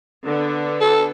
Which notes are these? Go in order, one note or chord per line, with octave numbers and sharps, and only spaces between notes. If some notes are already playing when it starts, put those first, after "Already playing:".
D3 B3
A4